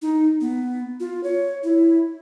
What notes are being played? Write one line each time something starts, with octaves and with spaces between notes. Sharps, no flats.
D#4
B3
F4
C#5
E4